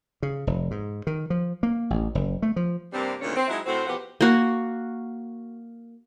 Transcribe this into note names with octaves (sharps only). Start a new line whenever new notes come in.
C#3
F1
G#2
D#3
F3
A#3
A1
F#1
A3
F3
G2 C3 G3 A#3 C4
D2 A#2 D3 D#3 G#3 C#4
C4
F#3 G#3 D#4 E4
A2 C4 F#4
E2 B2 F3 G4 B4 F#5
A#3 F#4